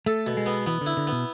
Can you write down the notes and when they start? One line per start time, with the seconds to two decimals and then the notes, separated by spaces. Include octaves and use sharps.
0.06 A3 A4
0.27 B2
0.37 G#3
0.46 B3
0.66 E3 B3
0.81 D3
0.86 E4
0.97 D3
1.07 B2 B3